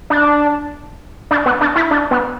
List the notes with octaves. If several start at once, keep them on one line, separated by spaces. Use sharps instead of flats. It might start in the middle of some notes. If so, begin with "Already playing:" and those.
D4
D4
B3
D4
E4
D4
B3